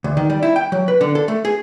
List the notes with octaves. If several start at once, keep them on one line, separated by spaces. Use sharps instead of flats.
D2
D#3
G3
E4
G5
F#3
B4
D3
A4
A3
G#4